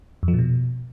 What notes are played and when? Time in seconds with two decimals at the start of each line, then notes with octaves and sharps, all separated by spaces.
0.23 F2
0.28 F3
0.33 A#2
0.39 B2